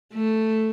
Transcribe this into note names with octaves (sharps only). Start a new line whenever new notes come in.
A3